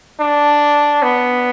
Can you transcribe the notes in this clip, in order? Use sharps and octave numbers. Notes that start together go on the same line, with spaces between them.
D4
B3